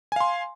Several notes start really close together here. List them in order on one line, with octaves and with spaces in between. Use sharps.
G#5 F5 C6